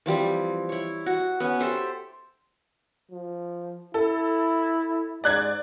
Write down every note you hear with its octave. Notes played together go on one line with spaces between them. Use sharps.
E3 F3 G3 C4
E4 C#5
F#4
B3 C#4
G4 A4 C5 E5
F3
E4 A4
G#2 D5 F#6 G#6